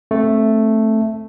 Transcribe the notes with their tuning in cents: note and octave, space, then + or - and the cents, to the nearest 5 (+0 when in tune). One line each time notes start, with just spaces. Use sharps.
A3 +0 C4 +20